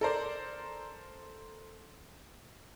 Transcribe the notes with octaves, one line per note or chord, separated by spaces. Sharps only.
A4 A#4 C5 D5